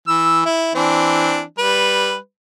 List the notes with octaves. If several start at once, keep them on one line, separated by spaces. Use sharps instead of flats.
E3 E6
E4
E3 C4 D4
G3 B4